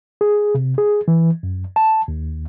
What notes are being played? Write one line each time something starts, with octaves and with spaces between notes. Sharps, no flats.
G#4
C3
G#4
E3
F#2
A5
D#2